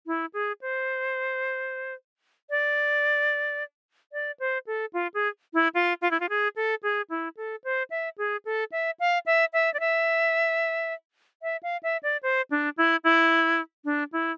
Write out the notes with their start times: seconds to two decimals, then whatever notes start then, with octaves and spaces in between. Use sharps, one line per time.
0.07 E4
0.34 G#4
0.61 C5
2.50 D5
4.13 D5
4.40 C5
4.67 A4
4.93 F4
5.14 G#4
5.54 E4
5.75 F4
6.02 F4
6.11 E4
6.20 F4
6.29 G#4
6.56 A4
6.83 G#4
7.10 E4
7.37 A4
7.64 C5
7.90 E5
8.18 G#4
8.45 A4
8.72 E5
9.00 F5
9.26 E5
9.53 E5
9.74 D5
9.80 E5
11.42 E5
11.63 F5
11.83 E5
12.03 D5
12.23 C5
12.51 D4
12.78 E4
13.04 E4
13.85 D4
14.13 E4